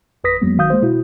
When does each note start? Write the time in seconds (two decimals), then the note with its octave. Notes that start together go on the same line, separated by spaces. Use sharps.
0.24 G#1 F2 B4 D#6 A#6 B6
0.42 F2 F#3 G#3 A#3 B3
0.57 G#1 D#3 F#4 F5 D#6 G6
0.70 G#3 A#3 C5
0.82 B2 E4 F#4